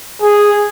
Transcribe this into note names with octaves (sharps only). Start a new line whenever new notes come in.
G#4